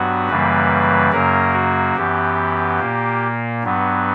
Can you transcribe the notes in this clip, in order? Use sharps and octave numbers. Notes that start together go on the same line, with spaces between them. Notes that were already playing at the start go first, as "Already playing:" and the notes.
Already playing: G2 F#3 B3 F#4
F#2 C#3 E3 G3 A#3 B4
F#2 C#3 F#3 A#3 A#4
F#4
F#2 E3 B3 G4
A#2 A#3
G2 F#3 B3